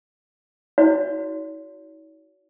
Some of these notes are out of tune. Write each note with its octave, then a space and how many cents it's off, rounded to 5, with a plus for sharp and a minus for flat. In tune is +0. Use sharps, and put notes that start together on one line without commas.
D#4 +40 F#4 +0 C#5 +45